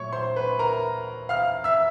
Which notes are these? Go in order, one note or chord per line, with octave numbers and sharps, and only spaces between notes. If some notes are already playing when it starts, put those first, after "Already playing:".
Already playing: A#2 F#3 A3 C#5 C#6
C5 C6
B4 B5
A#4 A#5
F5 F6
E5 E6